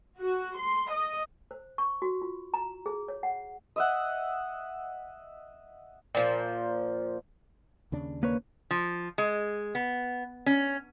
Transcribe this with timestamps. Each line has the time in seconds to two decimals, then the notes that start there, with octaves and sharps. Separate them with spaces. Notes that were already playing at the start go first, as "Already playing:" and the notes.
0.18 F#4
0.58 C6
0.91 D#5
1.51 C5
1.78 C#6
2.02 F#4
2.22 F4
2.54 A#5
2.86 G#4
3.08 C#5
3.23 F#5
3.76 D#5 E5 F#5
6.15 A#2 F3
7.92 D#2 C#3 D4
8.23 A#3 B4 C#5
8.71 F3
9.18 G#3
9.75 B3
10.46 C#4